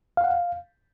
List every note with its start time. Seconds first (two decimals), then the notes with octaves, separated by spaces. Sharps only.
0.17 F5
0.24 F#5
0.30 F5